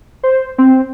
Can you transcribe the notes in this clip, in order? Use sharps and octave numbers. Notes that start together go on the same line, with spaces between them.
C5
C4